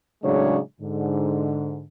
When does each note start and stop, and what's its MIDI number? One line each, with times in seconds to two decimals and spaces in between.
0.23 0.58 45
0.23 0.58 49
0.23 0.58 54
0.23 0.58 56
0.23 0.58 62
0.23 0.58 73
0.81 1.84 44
0.81 1.84 50